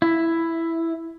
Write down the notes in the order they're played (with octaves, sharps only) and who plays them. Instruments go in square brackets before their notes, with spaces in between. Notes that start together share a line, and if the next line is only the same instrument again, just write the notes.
[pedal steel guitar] E4